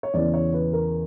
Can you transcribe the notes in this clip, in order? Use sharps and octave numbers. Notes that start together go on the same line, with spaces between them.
C#5
E2 C#3 E3 D5
C#5
B4
A#4